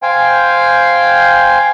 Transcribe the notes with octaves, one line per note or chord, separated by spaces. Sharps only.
C5 F5 G5 G#5